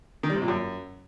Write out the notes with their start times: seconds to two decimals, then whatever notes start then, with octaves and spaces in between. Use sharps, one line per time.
0.23 D#3
0.30 G3
0.36 C3
0.42 A#2
0.48 F#2